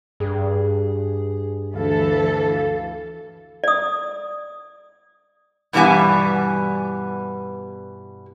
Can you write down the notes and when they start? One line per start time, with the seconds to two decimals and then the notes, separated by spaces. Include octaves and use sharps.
0.20 G2 G#4
1.75 D2 E3 A4 F5
3.64 D5 D#6
5.73 G2 B2 E3 G3 B3 G#5